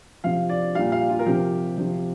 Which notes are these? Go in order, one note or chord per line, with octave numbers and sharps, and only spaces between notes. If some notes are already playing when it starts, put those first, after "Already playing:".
C3 F3 F5
D5
A#2 G3 F5
F5
F4
A#4
C3 F3 G4
C3 F3